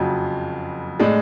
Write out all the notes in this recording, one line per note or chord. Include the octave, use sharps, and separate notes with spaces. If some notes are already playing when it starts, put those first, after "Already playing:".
Already playing: F#1 F2 C#3 F#3
A2 G#3 D4